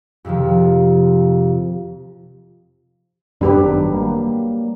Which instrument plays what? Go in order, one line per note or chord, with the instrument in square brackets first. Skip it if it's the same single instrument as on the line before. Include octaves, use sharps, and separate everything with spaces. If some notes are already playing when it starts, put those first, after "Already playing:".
[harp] F2 C3 D#3 F3
[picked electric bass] F#2 G3 B3 [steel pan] D4 G4 B4
[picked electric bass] G#1 D#3 F#3
F#3 G3 A#3